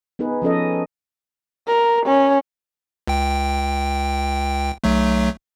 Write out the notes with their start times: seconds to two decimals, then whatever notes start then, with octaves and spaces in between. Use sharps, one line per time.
0.19 B3 D#4 G#4 B4
0.42 F3 C#4 A4 D#5
1.67 A#4
2.06 C#4
3.07 C#2 G5
4.84 B1 F#3 A3